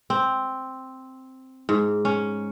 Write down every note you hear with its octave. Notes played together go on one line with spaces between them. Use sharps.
C4
G#2
C#4